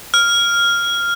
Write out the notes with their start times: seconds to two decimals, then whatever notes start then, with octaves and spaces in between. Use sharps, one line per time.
0.14 F6